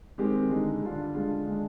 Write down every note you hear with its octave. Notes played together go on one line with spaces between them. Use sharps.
D#3 G#3 C4 G4
D3 G#3 D#4
D3 G3 D4 F4
D3 G#3 D4 F4 G#4
D3 G#3 D4